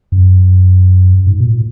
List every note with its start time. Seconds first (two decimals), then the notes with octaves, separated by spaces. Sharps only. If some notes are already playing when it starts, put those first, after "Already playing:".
0.12 F#2
1.27 G#2
1.40 B2
1.45 A#2